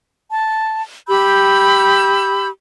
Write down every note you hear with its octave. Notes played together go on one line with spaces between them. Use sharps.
A5
G4 B5 E6 G6